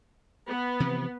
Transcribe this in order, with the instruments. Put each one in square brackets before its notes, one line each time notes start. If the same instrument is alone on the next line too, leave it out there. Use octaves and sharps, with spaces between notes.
[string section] B3
[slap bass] C3 E3 F3